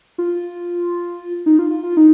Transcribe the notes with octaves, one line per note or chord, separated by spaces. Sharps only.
F4
D#4
F4
F4
F4
D#4